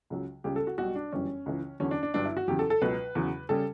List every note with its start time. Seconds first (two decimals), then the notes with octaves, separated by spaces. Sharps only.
0.10 C#2 C#3 F#3
0.44 C#2 C#3 G3 G4
0.56 A4
0.67 F#4
0.78 B1 B2 G3 F#4
0.95 D4
1.12 G1 F#2 E3 G3 C#4
1.46 C#2 C#3 E3
1.80 E2 D3 F#3 C#4
1.91 D4
2.03 D4
2.14 G1 G2 F#3 D4
2.25 E4
2.37 F#4
2.48 E2 C#3 F#3 G4
2.59 A4
2.70 A4
2.81 C#2 B2 F#3 B4
3.15 E2 C#3 F#3
3.49 C#3 G3 A4